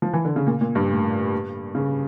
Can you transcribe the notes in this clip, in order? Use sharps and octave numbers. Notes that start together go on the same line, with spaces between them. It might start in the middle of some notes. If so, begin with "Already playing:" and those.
F3
E3
D3
C#3
A#2
A#2
G2
A2
C#3